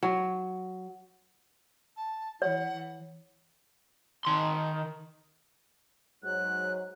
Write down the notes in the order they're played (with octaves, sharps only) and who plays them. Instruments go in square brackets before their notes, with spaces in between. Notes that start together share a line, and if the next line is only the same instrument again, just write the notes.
[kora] F#3
[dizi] A5
[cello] E3 [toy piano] C#5 [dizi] F#5
[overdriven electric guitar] D#3 C6
[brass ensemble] G#2 F#3 [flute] F#6